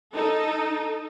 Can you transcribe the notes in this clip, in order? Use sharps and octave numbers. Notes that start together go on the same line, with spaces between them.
D#4 A4